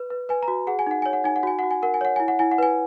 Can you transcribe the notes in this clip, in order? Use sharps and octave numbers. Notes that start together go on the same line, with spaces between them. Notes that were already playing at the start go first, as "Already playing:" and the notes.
Already playing: B4
B4
B4 G#5
A#5
F#4
G#4 F#5
G#5
D#4 F#5
C#5 G#5
F#5
D#4 G#5
F#5
F#4 G#5
F#4 F#5
G#5
A#4 F#5
G#5
C#5 F#5
E4 G#5
F#5
E4 G#5
F#5
B4 G#5